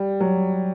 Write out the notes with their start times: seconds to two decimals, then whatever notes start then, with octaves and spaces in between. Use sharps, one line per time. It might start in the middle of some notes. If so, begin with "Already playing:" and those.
Already playing: G3
0.20 F#3